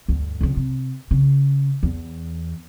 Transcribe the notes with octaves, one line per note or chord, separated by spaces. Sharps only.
D2 G2
C#2 C#3
C3
C#3
E2